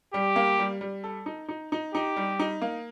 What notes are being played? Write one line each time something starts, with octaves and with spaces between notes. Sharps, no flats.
G3 G4
A#3
G3
G3
A4
D#4
D#4
D#4
D#4 G4
G3
D#4
A#3